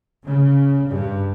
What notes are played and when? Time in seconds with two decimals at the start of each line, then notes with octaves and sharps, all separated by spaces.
0.23 C#3
0.88 G2